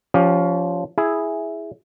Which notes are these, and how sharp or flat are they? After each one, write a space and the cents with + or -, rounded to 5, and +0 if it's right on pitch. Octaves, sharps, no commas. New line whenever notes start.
F3 +0 C#4 +25 G4 +0
E4 +0 G#4 +0